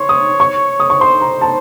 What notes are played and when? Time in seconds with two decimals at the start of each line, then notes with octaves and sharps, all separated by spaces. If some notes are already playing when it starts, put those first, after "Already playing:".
Already playing: C#5 C6
0.09 D#6
0.40 C#6
0.80 D#6
0.90 C#6
1.01 C5 C6
1.21 A#5
1.41 A5